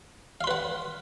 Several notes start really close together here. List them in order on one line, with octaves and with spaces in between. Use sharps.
F5 C6 B4 F#5